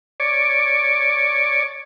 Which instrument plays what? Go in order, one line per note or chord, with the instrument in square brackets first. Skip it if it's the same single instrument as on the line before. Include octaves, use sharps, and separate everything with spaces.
[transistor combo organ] C#5 D5